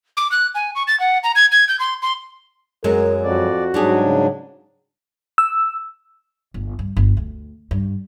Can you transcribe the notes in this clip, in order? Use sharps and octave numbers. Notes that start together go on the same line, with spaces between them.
D6
F#6
G#5
C#6
A6
F#5
A#5
G#6
G#6
G6
C6
C6
F#2 F#3 G#3 A#4
F2 F#4 D5
G#2 F#3 G3 D4 G4 G#4
C#3
E6
G1
G2
G1
D2
G2